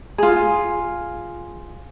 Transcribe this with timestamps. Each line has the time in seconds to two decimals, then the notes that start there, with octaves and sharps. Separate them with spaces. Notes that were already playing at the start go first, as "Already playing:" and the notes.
0.18 F4 G#4